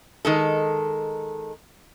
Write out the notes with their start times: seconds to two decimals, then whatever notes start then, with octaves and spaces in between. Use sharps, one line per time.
0.25 D#3 G#3 A4